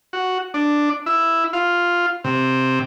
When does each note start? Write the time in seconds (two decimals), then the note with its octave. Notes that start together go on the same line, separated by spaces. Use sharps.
0.13 F#4
0.54 D4
1.06 E4
1.53 F4
2.24 C3